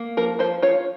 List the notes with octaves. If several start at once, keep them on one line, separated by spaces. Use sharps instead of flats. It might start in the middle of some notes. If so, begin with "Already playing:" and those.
Already playing: A#3
F3 A#4
F3 C5
F4 C#5